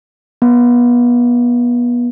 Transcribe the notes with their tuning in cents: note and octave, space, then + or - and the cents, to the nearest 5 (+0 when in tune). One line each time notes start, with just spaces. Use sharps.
B3 -30